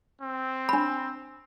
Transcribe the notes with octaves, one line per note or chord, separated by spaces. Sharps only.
C4
D4 B5